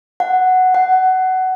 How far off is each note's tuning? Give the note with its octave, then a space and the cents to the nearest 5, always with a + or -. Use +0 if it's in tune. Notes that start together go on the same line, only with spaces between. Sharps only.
F#5 +0
F#5 +15